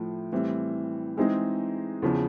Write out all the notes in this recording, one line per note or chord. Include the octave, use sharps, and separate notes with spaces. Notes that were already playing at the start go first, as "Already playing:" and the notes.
Already playing: A2 F3 A3
A2 E3 G3 C4
E3 G#3 C4 D#4 G#4
E2 C#3 F3